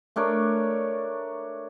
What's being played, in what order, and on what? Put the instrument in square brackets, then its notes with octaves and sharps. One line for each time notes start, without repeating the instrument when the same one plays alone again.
[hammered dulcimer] A3 D4 A#4 C#5